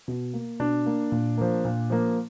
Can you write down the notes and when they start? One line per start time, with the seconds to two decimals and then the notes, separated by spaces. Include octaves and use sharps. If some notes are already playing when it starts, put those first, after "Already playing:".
0.08 B2
0.33 A#3
0.60 B2 D4
0.86 A#3
1.12 A#2
1.37 F3 A#3
1.65 A#2
1.90 F3 A#3